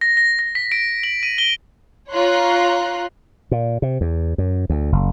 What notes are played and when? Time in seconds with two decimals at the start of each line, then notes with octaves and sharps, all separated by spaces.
0.01 A#6
0.17 A#6
0.39 A#6
0.55 B6
0.72 D7
1.03 F#7
1.23 D#7
1.38 G7
2.13 F4 C#5 A#5 C6 F#6
3.51 A#2
3.82 C3
4.01 E2
4.38 F#2
4.70 D2
4.92 F#1